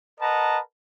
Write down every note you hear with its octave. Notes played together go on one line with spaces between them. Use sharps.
A#4 B4 D#5 F#5 A5 A#5